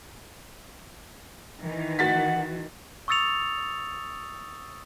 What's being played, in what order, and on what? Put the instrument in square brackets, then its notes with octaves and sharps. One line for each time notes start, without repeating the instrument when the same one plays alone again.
[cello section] D#3 E3
[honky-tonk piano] F#4 A6 B6 [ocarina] F#5
[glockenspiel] C#6 D#6 E6 A6 C#7 F7